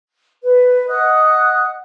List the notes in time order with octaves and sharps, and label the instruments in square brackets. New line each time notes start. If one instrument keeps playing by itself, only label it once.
[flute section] B4
D#5 F#5 D#6 F#6